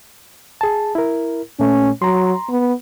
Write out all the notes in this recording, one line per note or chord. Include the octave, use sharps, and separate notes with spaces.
G#4 A5
E4 A#4
A#2 A3 C#4
F#3 A#5 C6
B3